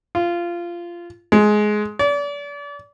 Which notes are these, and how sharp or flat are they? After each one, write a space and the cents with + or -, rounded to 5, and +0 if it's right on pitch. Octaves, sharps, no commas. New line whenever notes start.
F4 -15
G#3 +15
D5 -35